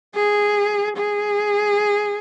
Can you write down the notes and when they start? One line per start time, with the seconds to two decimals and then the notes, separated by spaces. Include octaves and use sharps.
0.15 G#4
0.97 G#4